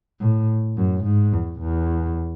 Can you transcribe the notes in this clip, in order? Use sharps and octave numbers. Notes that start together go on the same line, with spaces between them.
A2
F#2
G#2
E2
E2